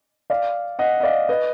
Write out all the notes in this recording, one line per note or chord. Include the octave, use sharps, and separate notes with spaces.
D5 F5
D#5 F#5
D#5
D5 F5
B4 D#5